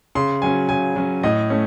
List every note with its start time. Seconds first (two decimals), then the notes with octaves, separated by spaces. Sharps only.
0.15 C#3 C6
0.42 F#3 C#4 G#5
0.69 C#3 G#5
0.96 F#3 C#4
1.23 A2 D#5
1.50 A3 C#4